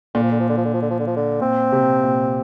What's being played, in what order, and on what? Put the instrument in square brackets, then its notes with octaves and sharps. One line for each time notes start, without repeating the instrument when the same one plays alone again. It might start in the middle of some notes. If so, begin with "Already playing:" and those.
[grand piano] A#2 [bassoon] D3
[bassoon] F3
D3
F3
D3
F3
D3
F3
D3
F3
D3
F3
D3
[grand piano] A#2 [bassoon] C4
[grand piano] C3
A#2